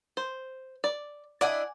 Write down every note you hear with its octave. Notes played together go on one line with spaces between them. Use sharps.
C5
D5
D4 E4 D5 D#5 F#5 G#5